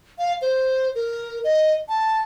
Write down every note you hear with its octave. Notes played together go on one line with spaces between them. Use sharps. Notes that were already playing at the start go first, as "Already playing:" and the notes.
F5
C5
A#4
D#5
A5